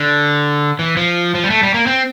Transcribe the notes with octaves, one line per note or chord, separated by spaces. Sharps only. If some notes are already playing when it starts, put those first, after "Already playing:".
Already playing: D3
E3
F3
F3
G3
A3
G3
A#3
C4